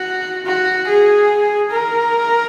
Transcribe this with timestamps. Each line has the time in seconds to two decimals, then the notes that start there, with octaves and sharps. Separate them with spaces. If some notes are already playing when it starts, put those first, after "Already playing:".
Already playing: F#4
0.46 F#4
0.87 G#4
1.71 A#4